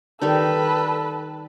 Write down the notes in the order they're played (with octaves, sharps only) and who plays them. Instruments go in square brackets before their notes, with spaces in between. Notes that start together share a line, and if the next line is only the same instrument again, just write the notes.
[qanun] D#3 G3 D#4 [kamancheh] A4 B4